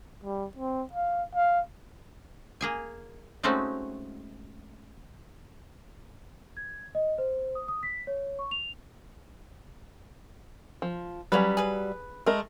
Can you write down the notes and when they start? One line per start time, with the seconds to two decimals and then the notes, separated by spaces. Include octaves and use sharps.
0.24 G3
0.57 C4
0.93 F5
1.35 F5
2.61 A#3 G#4 G#5
3.43 G#3 A3 C4 C#4 D#4 F#4
6.57 G#6
6.95 D#5
7.18 C5
7.55 D#6
7.68 D#6
7.83 B6
8.07 C#5
8.39 C#6
8.51 F7
10.82 F3
11.32 F#3 G3 C#4 F#4 B4
11.57 G#4 B4
12.26 G#3 A3 A#4 D#5